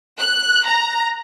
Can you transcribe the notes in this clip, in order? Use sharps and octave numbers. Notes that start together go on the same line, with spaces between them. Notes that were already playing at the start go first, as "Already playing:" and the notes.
F#6
A#5